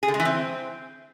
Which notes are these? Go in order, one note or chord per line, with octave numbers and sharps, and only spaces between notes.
G#4
D3
G#3
E3
C4